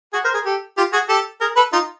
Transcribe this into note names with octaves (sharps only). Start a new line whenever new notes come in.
F#4 G#4
A#4 C5
G#4 A#4
G4 A4
F4 G4
F#4 G#4
G4 A4
G#4 A#4
A4 B4
D#4 F4